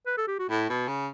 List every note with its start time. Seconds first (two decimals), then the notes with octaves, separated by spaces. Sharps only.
0.07 B4
0.18 A4
0.28 G4
0.39 F#4
0.50 A2 E4
0.69 B2
0.87 C#3